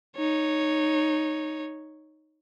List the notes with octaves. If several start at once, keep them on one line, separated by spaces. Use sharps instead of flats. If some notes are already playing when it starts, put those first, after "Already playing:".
D#4 C#5